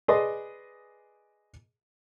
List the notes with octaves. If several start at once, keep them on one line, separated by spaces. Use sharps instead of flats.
G#4 B4 D5 D#5 C6